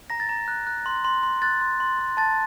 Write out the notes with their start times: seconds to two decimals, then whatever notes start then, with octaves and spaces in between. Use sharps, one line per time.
0.10 A#5 A#6
0.20 A6
0.29 A#5
0.48 F#6
0.67 F#6
0.86 C6
1.05 C6
1.23 C6
1.42 F#6 A6
1.61 C6
1.80 C6
1.99 C6
2.17 A5 A6